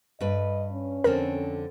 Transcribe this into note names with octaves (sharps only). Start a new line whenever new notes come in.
G2 B4 D#5
C#4
F2 D3 C4 A#4